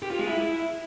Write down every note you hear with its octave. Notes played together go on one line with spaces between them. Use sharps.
G4
F4
G#3
E4